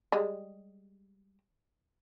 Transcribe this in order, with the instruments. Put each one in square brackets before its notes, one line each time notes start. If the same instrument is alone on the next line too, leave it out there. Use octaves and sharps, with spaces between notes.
[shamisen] G3 G#3